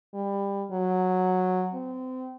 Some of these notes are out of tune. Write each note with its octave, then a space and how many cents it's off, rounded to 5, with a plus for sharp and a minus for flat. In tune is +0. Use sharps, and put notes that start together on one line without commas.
G3 +20
F#3 -10
C4 -30